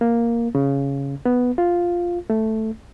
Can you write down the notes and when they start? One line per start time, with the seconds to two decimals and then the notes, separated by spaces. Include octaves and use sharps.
0.01 A#3
0.55 C#3
1.25 B3
1.58 F4
2.30 A3